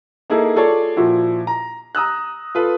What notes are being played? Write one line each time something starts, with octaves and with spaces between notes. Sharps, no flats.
A#3 D#4 E4 G#4 A4
F4 G#4 A4 C#5 D5
A#2 F3 E4 F#4
A#5
A#5 D#6 E6 F#6
F4 A4 B4